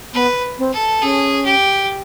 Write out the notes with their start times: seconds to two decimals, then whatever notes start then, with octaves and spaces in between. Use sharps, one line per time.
0.14 B3 B4
0.58 C4
0.73 A4
1.02 C#4 G#4
1.45 G4